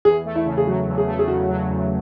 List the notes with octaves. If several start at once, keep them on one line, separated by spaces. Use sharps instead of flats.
E2 G#4
A3
E4
C#3
G#4
F#3 F#4
E2
G#4
A3
G#4
C#3 F#4
F#3
E2